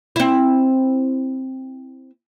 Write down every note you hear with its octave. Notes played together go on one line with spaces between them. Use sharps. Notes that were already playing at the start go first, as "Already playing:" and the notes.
C4 E4